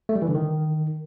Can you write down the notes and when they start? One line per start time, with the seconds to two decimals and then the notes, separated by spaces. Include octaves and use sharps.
0.09 A3
0.15 G3
0.22 E3
0.28 D3
0.35 D#3